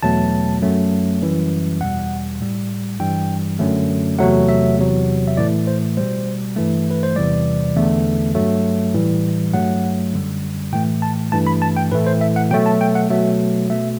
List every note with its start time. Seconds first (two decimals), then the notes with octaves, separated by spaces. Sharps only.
0.03 E2 B2 F#3 A3 A5
0.62 F#2 F#3 A3
1.21 F#2 E3 G3
1.80 E2 B2 G3 F#5
2.41 A2 G3
3.00 G2 E3 G3 G5
3.59 F#2 D3 F#3 A3
4.19 E2 C3 F#3 A3 F#5
4.49 E5
4.78 E2 C3 F#3
5.28 E5
5.37 A2 E3 A3 D5
5.67 C5
5.97 B2 G3 C5
6.56 G2 E3 A3
6.91 B4
7.03 C5
7.16 E2 C3 E3 G3 D5
7.75 E2 D3 A3
8.35 G2 F#3 A3
8.94 A2 E3 G3
9.54 G2 F#3 A3 F#5
10.13 F#2 D3 G3
10.73 A2 E3 A3 G5
11.02 A5
11.32 G2 E3 A3 A5
11.47 B5
11.62 A5
11.77 G5
11.92 A2 E3 A3 B4
12.06 C5
12.21 E5
12.36 F#5
12.51 B2 F#3 A3 G5
12.66 A5
12.81 G5
12.95 F#5
13.10 B2 F#3 A3 E5
13.70 B2 A3 E5